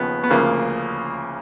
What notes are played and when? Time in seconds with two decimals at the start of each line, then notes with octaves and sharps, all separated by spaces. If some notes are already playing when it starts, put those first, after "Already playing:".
Already playing: D#2 C#3 F3 B3
0.24 B3
0.30 D2 C#3 F3 A#3